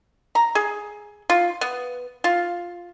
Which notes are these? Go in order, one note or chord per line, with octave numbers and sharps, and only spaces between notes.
A#5
G#4
F4
B3
F4